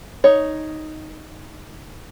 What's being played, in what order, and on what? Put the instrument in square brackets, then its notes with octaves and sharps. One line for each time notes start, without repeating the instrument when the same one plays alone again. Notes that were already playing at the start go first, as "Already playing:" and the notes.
[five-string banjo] D#4 C#5